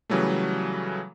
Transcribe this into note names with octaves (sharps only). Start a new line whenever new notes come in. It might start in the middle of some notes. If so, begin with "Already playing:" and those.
C#3 E3 F#3 G3 A3